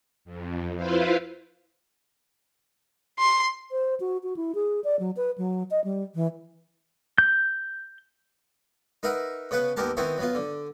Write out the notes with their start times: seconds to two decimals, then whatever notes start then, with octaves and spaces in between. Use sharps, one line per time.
0.25 F2
0.77 E4 F4 B4 C5 F5
3.19 C6
3.71 C5
4.00 F#4
4.23 F#4
4.36 E4
4.55 G#4
4.84 D5
4.99 F#3
5.16 B4
5.38 F#3
5.71 D#5
5.84 G3
6.15 E3
7.18 G6
9.03 D#4 A#4 B4 E5 F#5
9.51 C#3 B3 B4 F#5
9.77 D#2 B3 G4 A#4 A5
9.97 D#3 B3 C4 E4 C#5
10.18 F#3 B3 F4
10.35 D3